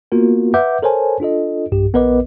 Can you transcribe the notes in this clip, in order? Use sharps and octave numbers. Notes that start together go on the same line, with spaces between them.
A#3 B3 F4 F#4 A#4
B4 E5 F#5 D6 G6
A4 A#4 C5 C#5 G#5 A5
D4 F4 A4 D#5
B1 G2 G4
A#1 B3 A#4 B4 D#5 D6